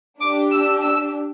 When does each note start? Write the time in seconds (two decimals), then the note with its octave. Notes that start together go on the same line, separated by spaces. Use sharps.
0.20 D4 G4 D6
0.51 E6
0.82 E6